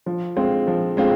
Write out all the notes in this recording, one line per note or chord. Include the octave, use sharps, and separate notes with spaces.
F3
G#3 C4 F4
F3
G#3 C4 F4